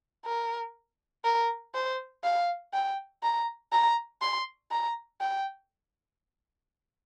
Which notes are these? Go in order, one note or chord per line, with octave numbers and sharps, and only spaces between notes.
A#4
A#4
C5
F5
G5
A#5
A#5
C6
A#5
G5